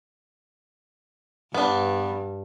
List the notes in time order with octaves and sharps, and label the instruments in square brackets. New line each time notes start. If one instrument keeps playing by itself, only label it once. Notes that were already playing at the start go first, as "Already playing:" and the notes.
[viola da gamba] G2 [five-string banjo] B3 D4